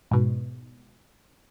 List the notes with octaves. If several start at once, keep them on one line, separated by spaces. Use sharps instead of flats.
G#2 B2